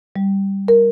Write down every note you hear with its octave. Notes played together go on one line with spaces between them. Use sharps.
G3
A#4